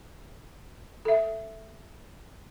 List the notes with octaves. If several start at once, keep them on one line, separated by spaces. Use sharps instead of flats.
A4 E5